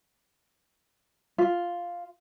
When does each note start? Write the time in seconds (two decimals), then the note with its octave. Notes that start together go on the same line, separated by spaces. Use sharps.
1.38 F4